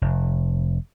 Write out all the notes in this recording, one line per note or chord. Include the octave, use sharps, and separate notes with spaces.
F1